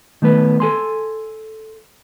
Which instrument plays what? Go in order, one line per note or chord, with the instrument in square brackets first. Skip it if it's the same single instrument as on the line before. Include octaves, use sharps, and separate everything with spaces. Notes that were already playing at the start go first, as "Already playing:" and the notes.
[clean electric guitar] D#3 A3 B3 B4
A4 G#5 C6